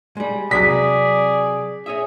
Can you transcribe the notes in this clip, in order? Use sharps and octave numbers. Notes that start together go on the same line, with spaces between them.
G3 G#3
C3 F#3 G#4 D5 A#5 B6
G#4 C#5 D#5 E5